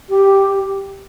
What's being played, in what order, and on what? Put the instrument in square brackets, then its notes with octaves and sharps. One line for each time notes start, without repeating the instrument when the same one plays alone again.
[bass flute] G4